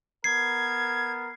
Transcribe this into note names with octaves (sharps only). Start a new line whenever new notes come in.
B3 A#4 G#6 C7